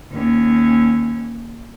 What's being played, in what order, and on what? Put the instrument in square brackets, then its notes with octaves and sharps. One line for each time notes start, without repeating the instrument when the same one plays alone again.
[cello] D#2 C#4